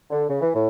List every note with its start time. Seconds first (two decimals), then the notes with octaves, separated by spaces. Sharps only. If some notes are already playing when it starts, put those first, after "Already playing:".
0.10 D3
0.29 C#3
0.40 E3
0.53 A2